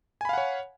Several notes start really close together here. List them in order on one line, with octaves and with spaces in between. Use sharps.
G#5 B5 F5 F#5 C#5